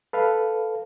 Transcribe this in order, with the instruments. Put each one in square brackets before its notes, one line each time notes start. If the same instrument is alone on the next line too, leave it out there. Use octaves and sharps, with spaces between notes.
[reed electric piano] A4 B4 F5